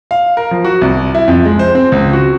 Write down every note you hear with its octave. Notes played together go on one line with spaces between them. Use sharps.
F5
A#4
F3
F#4
C2
E4
F2
G#3
C5
C4
C#2
F#4